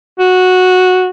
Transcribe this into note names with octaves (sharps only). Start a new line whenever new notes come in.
F#4